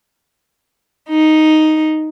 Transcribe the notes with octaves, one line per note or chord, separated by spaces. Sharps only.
D#4